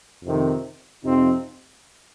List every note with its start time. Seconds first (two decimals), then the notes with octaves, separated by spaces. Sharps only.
0.23 F2 C3 D#3
1.04 F2 C3 F3 C4 D#4